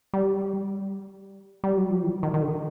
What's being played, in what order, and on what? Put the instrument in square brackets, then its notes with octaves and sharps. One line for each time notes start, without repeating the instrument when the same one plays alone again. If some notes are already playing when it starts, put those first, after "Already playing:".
[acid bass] G3
G3
F#3
F3
E3
D#3
D#3
D3